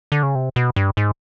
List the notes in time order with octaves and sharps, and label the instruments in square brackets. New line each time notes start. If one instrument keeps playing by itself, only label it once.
[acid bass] D3
C#3
C3
B2
G2
G#2